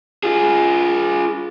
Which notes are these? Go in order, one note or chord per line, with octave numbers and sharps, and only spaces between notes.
F4 G#4